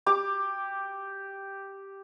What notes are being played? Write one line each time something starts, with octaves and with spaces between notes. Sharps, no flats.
G4 D6